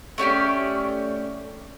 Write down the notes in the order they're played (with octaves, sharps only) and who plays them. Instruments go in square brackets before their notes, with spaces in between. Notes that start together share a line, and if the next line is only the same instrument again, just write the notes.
[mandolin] A3 C#4 G4 D5